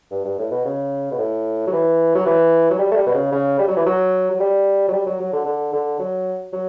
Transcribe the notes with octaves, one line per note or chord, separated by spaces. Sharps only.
G2
G2
A2
B2
C#3
B2
A2
F#3
E3
F#3
E3
F#3
G3
A3
G3
B2
C#3
C#3
G3
F#3
E3
F#3
F#3
G3
F#3
G3
F#3
F#3
D3
D3
D3
F#3
F#3